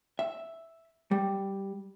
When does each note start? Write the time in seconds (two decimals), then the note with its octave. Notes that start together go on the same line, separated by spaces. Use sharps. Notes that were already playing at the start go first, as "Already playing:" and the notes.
0.19 E5
1.11 G3